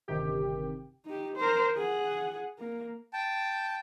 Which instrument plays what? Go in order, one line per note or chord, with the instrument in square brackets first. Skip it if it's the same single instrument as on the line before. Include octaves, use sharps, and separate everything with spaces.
[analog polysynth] G1 C3 D#3 G4
[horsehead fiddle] D#4 G4
A#4 C5
G#4 F#5
A#3
[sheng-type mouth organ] G5 A5